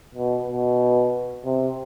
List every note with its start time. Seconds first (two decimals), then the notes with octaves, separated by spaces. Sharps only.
0.15 B2
0.47 B2
1.45 C3